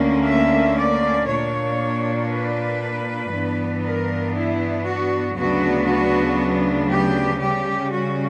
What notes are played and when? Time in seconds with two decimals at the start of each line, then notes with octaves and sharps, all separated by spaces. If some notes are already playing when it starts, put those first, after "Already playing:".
Already playing: D2 D3 A#3 C#4
0.25 E5
0.75 D5
1.27 A#2 A#3 D4 C#5
2.29 B4
3.31 G2 E3 B3 D4
3.82 A#4
4.33 E4
4.84 F#4
5.35 D2 C#3 F#3 B3 D4 F#4
5.86 F#4
6.88 G4
7.39 C#3 G3 C#4 G4
7.90 F#4